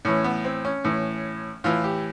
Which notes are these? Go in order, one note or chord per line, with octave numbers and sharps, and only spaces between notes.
A2 E3 C#4
B3
C4
C#4
A2 E3
A2 E3 F4
G4